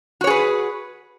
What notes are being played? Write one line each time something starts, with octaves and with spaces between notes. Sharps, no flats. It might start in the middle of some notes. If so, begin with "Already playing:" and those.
F#4 G#4 B4 C#5